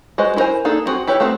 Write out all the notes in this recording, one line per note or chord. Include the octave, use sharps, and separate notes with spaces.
G#3 F#4 B4 C5 D#5
E4 F#4 A#4 C5 G#5
A#3 D4 D#4 G#4 A4
B3 C4 F#4 G#4
E4 G4 B4 C#5
A3 B3 C4 F#4